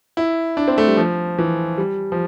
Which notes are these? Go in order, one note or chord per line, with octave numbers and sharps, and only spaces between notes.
E4
D4
C4
A3
G3
F3
E3
G3
F3